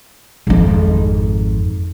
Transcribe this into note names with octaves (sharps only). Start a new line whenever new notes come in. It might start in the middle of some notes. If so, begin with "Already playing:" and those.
G#1 F2